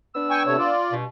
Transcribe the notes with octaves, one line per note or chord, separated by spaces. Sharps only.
B3 D4 E6
G5 G#5 C#6
C3 A3 C#5
F4 D5
G2 B2